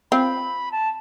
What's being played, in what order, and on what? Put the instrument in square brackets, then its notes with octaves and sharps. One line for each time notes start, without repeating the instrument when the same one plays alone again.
[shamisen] C4 F4 [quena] B5
[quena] A5